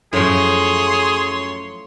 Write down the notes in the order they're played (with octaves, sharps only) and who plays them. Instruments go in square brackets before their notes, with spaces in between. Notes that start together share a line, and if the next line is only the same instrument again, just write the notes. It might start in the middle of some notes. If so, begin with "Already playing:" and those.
[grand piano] F#2 [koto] A2 F3 [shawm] G#4 [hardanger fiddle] C#5 C6